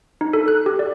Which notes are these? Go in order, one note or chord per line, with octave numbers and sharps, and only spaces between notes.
D#4
A4
F#6
G4
D5